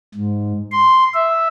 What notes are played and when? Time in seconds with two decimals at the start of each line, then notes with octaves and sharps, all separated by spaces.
0.14 G#2
0.71 C6
1.14 E5